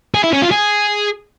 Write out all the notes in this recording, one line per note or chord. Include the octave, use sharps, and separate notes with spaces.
G#4
E4
C#4
F4
G#4